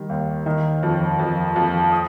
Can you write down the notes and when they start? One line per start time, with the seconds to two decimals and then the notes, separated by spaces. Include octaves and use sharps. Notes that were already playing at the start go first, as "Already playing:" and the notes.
Already playing: D#3 G3
0.09 D#2
0.46 D#3
0.83 F2
1.19 F2
1.56 F2
1.92 D#6